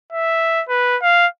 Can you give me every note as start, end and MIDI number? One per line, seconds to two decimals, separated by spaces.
0.13 0.63 76
0.69 0.97 71
1.02 1.27 77